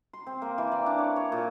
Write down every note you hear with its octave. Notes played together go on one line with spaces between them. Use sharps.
C6
C4
A#3
E3
D5
D4
C#5
C#5
A#2